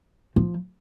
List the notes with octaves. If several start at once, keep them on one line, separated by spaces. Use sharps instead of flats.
F3